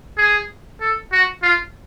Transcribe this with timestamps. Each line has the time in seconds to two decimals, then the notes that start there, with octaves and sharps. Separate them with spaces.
0.18 G#4
0.81 A4
1.12 F#4
1.43 F4